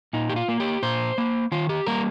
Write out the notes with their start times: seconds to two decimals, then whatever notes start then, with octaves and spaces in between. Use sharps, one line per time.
0.13 A#2 D#4
0.30 G4
0.36 F4
0.49 A#3
0.60 G4
0.83 A#2 C5
1.18 A#3
1.52 D#3 F4
1.69 G4
1.86 G3 A#3 A#4